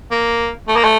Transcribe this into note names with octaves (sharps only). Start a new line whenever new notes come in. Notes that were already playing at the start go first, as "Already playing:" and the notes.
A#3
A3
A#3
A3